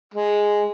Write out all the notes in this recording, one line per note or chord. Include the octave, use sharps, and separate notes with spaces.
G#3